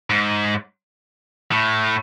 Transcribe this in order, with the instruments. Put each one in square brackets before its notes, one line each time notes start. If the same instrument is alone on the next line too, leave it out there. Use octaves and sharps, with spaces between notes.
[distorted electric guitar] G#2
A2